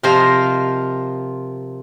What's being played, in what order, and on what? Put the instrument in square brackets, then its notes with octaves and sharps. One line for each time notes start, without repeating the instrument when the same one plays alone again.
[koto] C3 F3 A#4 C5 D#5 F5